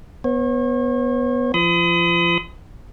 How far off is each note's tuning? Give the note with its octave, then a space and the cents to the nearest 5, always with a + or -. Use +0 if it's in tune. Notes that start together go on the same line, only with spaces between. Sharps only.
B3 -5 C#5 -40
F3 -35 B5 +45 D#6 +20